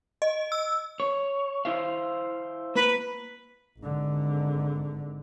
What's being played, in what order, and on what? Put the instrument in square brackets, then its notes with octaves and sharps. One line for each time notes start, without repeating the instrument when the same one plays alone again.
[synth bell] D#5
E6
[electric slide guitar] C#5
E4 C5 F5
[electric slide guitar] A#3 [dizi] B4
[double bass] G#1 D3